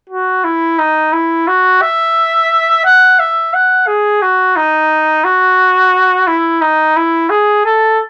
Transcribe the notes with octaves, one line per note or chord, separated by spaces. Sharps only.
F#4
E4
D#4
E4
F#4
E5
F#5
E5
F#5
G#4
F#4
D#4
F#4
E4
D#4
E4
G#4
A4